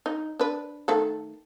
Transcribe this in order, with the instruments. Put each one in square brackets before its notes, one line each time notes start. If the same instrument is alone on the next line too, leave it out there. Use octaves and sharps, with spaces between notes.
[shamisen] D#4
D4 B4
D#3 A3 A4